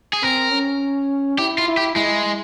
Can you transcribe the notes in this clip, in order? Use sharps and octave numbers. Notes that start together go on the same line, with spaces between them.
G#4
C4 A#4
C#4
E4 G4
F4
E4
G4
G#3 E4